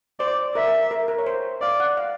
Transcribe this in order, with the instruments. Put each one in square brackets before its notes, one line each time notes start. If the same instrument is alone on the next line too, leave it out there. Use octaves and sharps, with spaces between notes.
[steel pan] C5 [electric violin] D5
[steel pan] A#4 [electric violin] E5
[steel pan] A#4
A#4
C#5
C5
[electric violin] D5 [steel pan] F5
[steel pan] F#5
F5